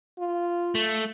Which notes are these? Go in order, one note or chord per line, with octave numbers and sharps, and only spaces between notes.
F4
A3